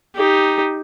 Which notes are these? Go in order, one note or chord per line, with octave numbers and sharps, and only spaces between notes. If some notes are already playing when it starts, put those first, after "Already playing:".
D#4 G4